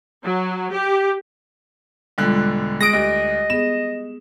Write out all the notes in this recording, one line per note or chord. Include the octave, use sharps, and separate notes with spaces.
F#3
G4
E1 D3 G3 G#3 F4 F#6
G#3 D#6 A#6 D7
D2 G4 D#5
B3 G#4 E7